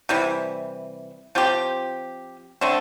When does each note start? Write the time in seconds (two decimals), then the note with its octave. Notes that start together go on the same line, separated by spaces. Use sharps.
0.09 C3 E3 G3
1.35 F3 C4 G4
2.61 D3 A3 C4